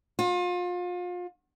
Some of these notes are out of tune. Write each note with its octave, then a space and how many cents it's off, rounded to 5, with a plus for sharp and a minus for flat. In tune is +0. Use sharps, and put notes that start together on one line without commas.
F4 +35